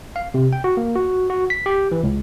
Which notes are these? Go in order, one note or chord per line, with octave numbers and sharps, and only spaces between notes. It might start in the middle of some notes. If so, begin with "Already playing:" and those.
F5
C3
G5
F#4
A#3
F#4
F#4
B6
G4
E3
C#2